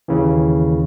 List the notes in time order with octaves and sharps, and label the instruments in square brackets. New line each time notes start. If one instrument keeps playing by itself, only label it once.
[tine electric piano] D#2 C#3 E3